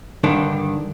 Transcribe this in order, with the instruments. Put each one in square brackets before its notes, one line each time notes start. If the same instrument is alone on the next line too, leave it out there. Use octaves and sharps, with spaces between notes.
[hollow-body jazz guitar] G2 D3 D#3 D4